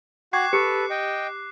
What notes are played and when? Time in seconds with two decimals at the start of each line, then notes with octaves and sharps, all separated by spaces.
0.33 F#4 F#5 G5 C#6 D6 F#6 G#6 C7
0.53 G4 A4 B4 C#7
0.90 D#5 G5